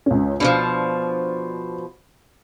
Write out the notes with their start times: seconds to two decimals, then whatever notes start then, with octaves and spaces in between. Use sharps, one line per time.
0.06 C#2 C#4
0.40 B2 D3 F3 D4